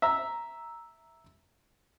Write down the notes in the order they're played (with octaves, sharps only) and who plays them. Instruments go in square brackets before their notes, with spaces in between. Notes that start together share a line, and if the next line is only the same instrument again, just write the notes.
[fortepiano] E5 A#5 E6